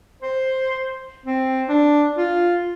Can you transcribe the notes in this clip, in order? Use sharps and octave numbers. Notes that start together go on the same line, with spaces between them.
C5
C4
D4
F4